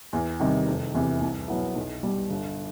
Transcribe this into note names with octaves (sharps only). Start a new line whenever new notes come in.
E2
C3 D#3 G3
F1
E2 C3 E3
C2
B2 F#3 B3 E4
B1
B2 G3
G1